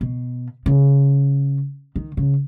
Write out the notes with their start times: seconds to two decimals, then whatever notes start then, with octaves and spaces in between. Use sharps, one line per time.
0.01 B2
0.66 C#3
1.96 D#3
2.17 C#3